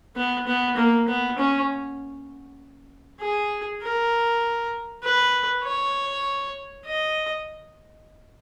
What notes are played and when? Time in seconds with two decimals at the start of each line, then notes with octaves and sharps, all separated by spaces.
0.16 B3
0.47 B3
0.77 A#3
1.08 B3
1.38 C#4
3.20 G#4
3.82 A#4
5.03 B4
5.64 C#5
6.86 D#5